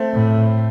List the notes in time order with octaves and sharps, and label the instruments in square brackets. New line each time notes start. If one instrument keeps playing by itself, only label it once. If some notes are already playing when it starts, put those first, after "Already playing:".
Already playing: [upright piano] A3 C4
[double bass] A2